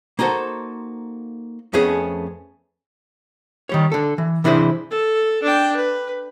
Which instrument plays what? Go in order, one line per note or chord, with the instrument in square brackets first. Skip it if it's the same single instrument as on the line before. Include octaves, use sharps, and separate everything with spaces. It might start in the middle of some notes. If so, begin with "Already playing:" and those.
[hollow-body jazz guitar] A#3 D#4 F#4 A4 C5
F2 A3 B3 C#4 G#4
D#3 G3 C#5
D3 A4
E3
C3 E3 D4 E4 G#4 C5
[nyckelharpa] A4
D4 G5
B4